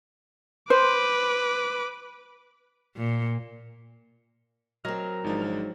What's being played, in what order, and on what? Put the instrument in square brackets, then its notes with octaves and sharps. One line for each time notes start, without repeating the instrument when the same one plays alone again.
[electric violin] B4 D6 [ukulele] C5
[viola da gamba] A#2
[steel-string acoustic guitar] F#3 C4 [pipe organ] A#4 A#5 [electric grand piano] D#5 F6 A#6
[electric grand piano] G#1 F3 D4 [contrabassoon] G#2